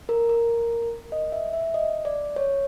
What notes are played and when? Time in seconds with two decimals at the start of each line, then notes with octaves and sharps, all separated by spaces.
0.09 A#4
0.29 A#4
1.12 D#5
1.32 E5
1.53 E5
1.74 D#5
2.05 D5
2.36 C#5